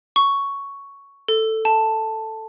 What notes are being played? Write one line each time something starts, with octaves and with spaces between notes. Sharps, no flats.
C#6
A4
A5